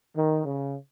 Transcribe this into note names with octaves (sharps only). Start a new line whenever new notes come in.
D#3
C#3